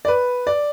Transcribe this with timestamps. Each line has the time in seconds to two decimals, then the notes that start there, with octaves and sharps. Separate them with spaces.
0.05 D5
0.08 B4
0.47 D5